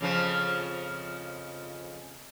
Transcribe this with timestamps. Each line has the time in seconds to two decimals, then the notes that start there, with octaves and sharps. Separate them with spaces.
0.01 F2 C#3 F3